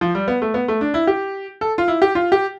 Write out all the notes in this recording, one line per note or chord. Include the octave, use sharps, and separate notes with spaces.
F3
G3
B3
A3
B3
A3
D4
E4
G4
A4
F4
E4
G4
F4
G4